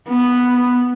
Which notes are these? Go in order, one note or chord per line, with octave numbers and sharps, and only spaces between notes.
B3